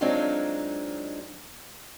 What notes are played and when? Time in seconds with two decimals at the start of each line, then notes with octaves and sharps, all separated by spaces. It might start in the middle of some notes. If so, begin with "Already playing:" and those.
0.01 F#3 G#3 C4 D4 D#4 F4